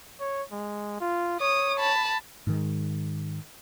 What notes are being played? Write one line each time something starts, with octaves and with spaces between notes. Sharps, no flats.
C#5
G#3
F4
C#5 D#6
A5 B5
G#2 D#3 G#3